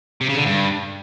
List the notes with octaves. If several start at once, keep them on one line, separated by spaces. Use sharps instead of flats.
C3
C#3
D3
G2